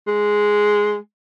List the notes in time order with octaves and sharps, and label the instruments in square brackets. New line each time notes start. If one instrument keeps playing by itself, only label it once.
[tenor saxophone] G#3